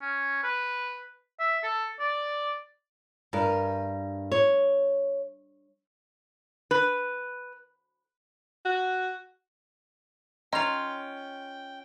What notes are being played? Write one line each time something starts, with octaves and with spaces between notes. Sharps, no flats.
C#4
B4
E5
A4
D5
G2 A#4
C#5
B4
F#4
D#3 C#4 F4 D#5 G5 A#5 C6 F7